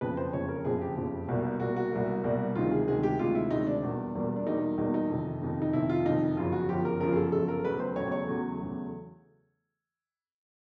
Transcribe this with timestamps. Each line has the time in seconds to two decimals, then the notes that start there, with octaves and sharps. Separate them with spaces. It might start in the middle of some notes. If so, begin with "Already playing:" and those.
0.01 F#1 F2 C#3 B4
0.17 C5
0.33 F#1 F2 C#3 C#5
0.49 A#4
0.65 F#1 F2 C#3 G#4
0.81 G4
0.97 F#1 F2 C#3
1.28 C2 B2 G3 A#3
1.60 C2 B2 G3 A#3 F#4
1.76 F#4
1.92 C2 B2 G3 A#3
2.24 C2 B2 G3 A#3
2.55 D2 C3 D#3 G#3 F4
2.71 G#4
2.87 D2 C3 D#3 G#3 G#4
3.03 G4
3.19 D2 C3 D#3 G#3 F4
3.35 E4
3.51 D2 C3 D#3 G#3 D#4
3.67 D4
3.83 E2 B2 G3 A#3
4.15 E2 B2 G3 A#3
4.36 D4
4.46 E2 B2 G3 A#3 D#4
4.78 E2 B2 G3 A#3 D#4
4.94 D#4
5.10 F2 C3 D#3
5.42 F2 C3 D#3
5.62 D#4
5.73 F2 C3 D#3 E4
5.89 F4
6.06 F2 C3 D#3 D#4
6.37 G1 F#2 C#3 F3 F4
6.52 F#4
6.68 G1 F#2 C#3 F3 G4
6.85 A#4
7.00 G1 F#2 C#3 F3 A#4
7.12 G#4
7.16 A4
7.32 G1 F#2 C#3 F3 A4
7.48 A#4
7.64 E2 C#3 F#3 A3 B4
7.80 C5
7.96 E2 C#3 F#3 A3 C#5
8.12 C#5
8.28 E2 C#3 F#3 A3
8.59 E2 C#3 F#3 A3